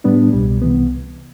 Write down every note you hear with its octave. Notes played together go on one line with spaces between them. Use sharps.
A2 G3 B3 D4
C2 B2 G3
C2 C3 E3 B3